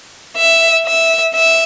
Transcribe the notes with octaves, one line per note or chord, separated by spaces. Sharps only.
E5
E5
E5